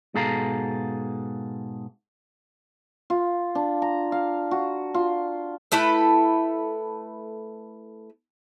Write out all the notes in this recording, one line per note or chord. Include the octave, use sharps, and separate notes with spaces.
G#2 B2 G#4 A4 F5 A#5
F4
D4
A#5
F5
F#4
F4
A3 E4 A4 B4